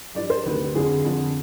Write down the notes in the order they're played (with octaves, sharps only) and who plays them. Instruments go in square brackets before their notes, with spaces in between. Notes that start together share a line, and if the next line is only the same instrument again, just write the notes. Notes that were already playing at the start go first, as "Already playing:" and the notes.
[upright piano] G2 F3 D5
C5
D2 C3 D#3 B4
F2 D3 F3 G#4
F2 D3 F3